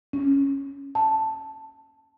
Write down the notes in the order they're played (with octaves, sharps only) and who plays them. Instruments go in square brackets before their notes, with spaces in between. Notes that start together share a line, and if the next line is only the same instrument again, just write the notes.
[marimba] C#4
A5